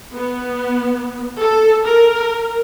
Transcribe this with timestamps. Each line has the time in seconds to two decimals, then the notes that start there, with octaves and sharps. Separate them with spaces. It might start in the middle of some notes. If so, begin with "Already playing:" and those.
0.14 B3
1.40 A4
1.86 A#4